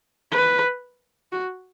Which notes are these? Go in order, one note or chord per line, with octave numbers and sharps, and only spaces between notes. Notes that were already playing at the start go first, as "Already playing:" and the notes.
B4
F#4